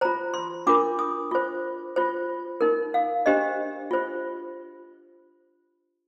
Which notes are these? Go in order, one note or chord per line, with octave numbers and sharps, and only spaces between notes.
F4 C5 A#5
C6
D4 F4 A#4 D6
D#6
F4 C5
F4 C5
D#4 A#4
F5
D4 G4 C5 D#5
F4 C5